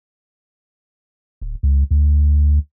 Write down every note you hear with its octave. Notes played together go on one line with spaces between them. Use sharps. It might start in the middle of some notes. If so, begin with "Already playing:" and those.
D1
C#2
D2